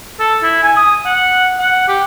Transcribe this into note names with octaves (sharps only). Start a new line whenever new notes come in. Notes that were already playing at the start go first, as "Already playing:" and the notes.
A4
E4
G#5
D#6
F#5
F#5
G4